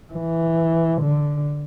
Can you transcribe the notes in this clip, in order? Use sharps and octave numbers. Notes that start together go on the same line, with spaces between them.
E3
D3